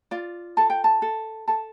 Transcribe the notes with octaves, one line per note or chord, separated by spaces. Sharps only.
F4 D5
A4 A5
G5
A5
A4
A4 A5